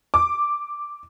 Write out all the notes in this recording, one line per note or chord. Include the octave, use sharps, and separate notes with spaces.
D6